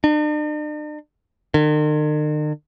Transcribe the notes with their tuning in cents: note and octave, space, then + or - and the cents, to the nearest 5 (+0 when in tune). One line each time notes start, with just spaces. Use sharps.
D4 +45
D#3 -45